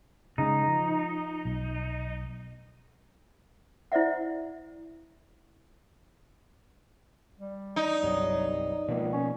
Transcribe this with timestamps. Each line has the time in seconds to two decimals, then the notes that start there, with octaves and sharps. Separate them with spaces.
0.38 C#3 G#3 D#4
0.68 F3
1.45 B1
3.92 E4 C5 D5 E5 F#5
7.39 G3
7.76 D#4 D5
8.02 G1 C2 G2 F#3
8.88 C#2 B2 F3 A#3
9.12 C#4